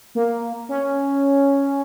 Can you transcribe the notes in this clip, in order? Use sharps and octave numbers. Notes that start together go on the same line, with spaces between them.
A#3
C#4